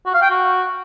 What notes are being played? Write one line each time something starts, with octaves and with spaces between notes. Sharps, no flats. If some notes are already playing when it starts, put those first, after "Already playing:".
F#4
F5
G5
F#4